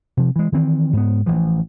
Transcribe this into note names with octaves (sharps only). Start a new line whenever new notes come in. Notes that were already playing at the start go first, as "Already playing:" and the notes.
C3 F3
E3 G#3
D#3 E3 C4
G#2 B3
A1 E3 F3